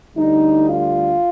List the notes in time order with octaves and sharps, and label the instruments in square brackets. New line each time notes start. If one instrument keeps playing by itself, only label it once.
[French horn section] D2 D3 G3 D#4
F4